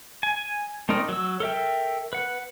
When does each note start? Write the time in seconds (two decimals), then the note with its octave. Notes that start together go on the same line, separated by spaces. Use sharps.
0.23 G#5
0.89 A3 C4 D#4 A#4 D5
1.09 F#3 E6
1.40 A4 A#4 E5 G5
2.13 B4 F#5